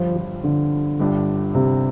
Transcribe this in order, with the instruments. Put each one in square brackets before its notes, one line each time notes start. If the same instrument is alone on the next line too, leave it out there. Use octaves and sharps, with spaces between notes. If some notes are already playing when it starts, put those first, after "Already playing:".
Already playing: [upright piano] G1 G2 G3 [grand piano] F3
[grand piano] F3
D3
[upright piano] G1 G2 G3 D4
[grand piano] C3